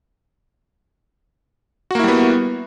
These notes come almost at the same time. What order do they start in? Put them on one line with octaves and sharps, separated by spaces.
F#4 A#3 E4 G3 B3